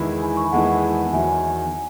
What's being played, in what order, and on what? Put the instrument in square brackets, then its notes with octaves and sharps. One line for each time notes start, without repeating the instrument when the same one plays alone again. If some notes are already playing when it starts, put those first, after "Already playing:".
Already playing: [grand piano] E2 D#3 G#3 B3 E4 [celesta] G#5 B5
[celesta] G#5 B5
C#6
B5
[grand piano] E2 D#3 G#3 B3 E4 [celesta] F#5 A5
[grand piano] E2 D#3 F#3 [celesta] E5 G#5